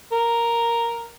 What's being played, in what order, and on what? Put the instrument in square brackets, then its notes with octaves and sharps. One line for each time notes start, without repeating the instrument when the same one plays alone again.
[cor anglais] A#4